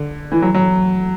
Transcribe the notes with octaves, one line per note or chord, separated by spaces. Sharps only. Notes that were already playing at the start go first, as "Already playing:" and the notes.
Already playing: D3
E3
F#3
F#3